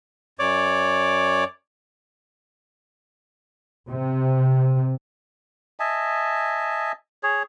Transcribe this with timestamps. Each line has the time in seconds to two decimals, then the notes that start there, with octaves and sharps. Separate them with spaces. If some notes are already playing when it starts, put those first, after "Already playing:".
0.39 F#2 C#5 D5 D6
3.88 C3
5.80 D#5 E5 G#5 A5
7.23 G#4 C#5